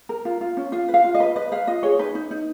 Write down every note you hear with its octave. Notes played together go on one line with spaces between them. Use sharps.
A#4
F4
F4
C#4
F4 F5
B4
F5
F4
D#5
B4
B4 D#5
B4 F5
F4 D#5
G#4 C#5
D#4 B4
D#4
D#4